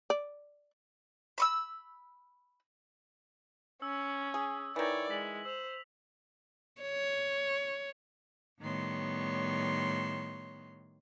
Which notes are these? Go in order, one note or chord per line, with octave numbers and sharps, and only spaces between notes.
D5
B5 C#6 E6
C#4 E6
G#4
D#3 E3 C#5 D5
G#3 B6 F#7
C5 E6 F7
C#5
A2 D#3 G3 B3 C#5 C6